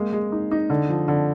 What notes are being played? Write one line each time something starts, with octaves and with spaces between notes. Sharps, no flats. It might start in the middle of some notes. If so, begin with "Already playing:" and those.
Already playing: G#3 A#3
G#3
D#4
D#4
D3
F3
D3